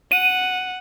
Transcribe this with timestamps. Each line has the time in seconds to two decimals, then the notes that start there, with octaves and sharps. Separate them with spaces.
0.12 F#5 D#7